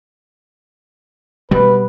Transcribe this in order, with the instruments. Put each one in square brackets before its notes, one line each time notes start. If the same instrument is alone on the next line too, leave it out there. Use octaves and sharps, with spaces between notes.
[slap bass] B2 G3 [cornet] B4